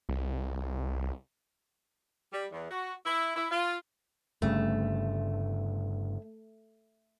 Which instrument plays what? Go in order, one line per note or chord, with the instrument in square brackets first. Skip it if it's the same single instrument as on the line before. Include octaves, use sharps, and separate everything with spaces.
[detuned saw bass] C2
[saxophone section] G3
E2
F#4
E4
E4
F4
[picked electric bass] G1 G2 C#3 [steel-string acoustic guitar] A3